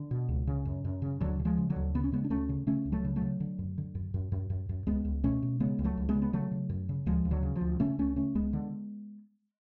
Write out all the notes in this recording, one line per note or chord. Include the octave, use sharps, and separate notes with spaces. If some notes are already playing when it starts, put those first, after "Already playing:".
Already playing: D3
B2
C#2
C#3
F#2
F#2
C#3
D2 D3 F#3
C#3
F3 G#3
C#3
D3 F#3
D2
C#3 B3
C#4
C#3 G#3 B3
D4
D2 A3 C#4
C#3
C#3 A3 C#4
C#2
F#3 A3
C#3
F#3 A3
C#3
D3
F#2
D3
F#2
F#2
F#2
F#2
F#2
C#2 G#3 B3
C#2
B2 A3 C#4
B2
C#3 G#3 B3
C#2
F#3 A3
C#2
G#3 B3
C#3
B3
C#3 F#3 A3
C#3
F#2
C#3
D2 F3 G#3
D2
D3 F#3
C#3
F3
D2
C#3 A3 C#4
C#2 A3 C#4
C#3 A3 C#4
C#2 G#3 B3
D3